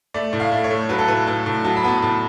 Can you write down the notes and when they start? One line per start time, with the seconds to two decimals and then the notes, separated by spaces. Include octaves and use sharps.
0.14 A3 D5
0.33 A2
0.40 F5
0.52 A3
0.64 C#5
0.71 A3
0.89 F#3 B4
0.99 A4
1.08 A2 B4
1.27 A2 A5
1.46 A2
1.64 F#3 A5
1.77 B5
1.84 B3 A5
2.02 A2 A5